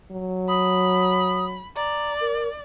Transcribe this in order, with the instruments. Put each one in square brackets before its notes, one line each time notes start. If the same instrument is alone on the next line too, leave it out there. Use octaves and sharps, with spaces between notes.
[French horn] F#3
[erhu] B5 [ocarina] D#6
[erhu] D5 [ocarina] A#5
[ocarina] A#4